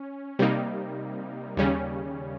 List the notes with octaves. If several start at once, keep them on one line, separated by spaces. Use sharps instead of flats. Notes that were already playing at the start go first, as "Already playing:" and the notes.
Already playing: C#4
C3 G3 A#3 D#4
D#2 C#3 G3 C#4